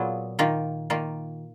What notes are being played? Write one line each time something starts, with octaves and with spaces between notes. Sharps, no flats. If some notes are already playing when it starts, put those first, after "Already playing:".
Already playing: A#2 F#3 B3 F4 G#4
D#3 A#3 F4
D#3 A#3 F4